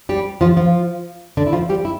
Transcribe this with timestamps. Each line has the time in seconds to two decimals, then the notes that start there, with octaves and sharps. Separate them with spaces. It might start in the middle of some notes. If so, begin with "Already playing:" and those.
0.09 G3 G4
0.41 F3 F4
0.57 F3 F4
1.37 D3 D4
1.46 E4
1.53 F3 F4
1.69 G3 G4
1.85 E4